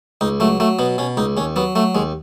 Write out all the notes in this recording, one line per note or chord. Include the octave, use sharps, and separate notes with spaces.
C#2 D#4
F#3 A3
F#3 A3
B2 B3
B2 C#4
C#2 D#4
D#2 C#4
F#3 B3
F#3 A3
D#2 G#3